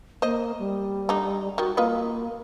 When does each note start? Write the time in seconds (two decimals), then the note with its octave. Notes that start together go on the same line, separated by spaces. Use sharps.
0.22 A#3 C5 D#5
0.59 G3
1.09 D3 D#4
1.58 D#3 F#4
1.77 A#3 F4 B4 D#5